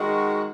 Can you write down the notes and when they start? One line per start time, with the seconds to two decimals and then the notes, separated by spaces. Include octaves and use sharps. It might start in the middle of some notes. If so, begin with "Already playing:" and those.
Already playing: D#3 G#3 F#4